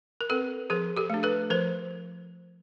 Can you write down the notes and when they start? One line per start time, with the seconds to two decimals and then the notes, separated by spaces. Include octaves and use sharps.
0.21 A#4
0.30 C4 A4 B4
0.70 F3 G#4 A#4
0.97 G4 A4
1.10 A3 D4
1.23 A4 B4
1.50 F3 A#4 C5